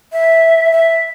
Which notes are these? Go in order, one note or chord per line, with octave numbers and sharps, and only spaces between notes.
E5
E5